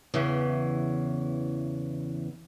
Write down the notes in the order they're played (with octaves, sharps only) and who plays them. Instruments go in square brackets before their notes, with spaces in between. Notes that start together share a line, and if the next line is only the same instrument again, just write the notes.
[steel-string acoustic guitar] E2 C#3 E3